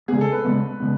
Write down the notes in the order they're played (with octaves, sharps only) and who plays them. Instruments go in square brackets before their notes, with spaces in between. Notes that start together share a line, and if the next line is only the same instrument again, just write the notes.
[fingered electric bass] C#3 G#3 B3 [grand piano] G#4
[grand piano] A4
B4
[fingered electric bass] C#3 G#3 B3
C#3 G#3 B3